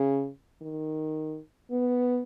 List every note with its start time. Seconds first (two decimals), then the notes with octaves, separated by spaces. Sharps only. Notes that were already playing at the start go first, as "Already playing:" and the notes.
Already playing: C#3
0.62 D#3
1.71 B3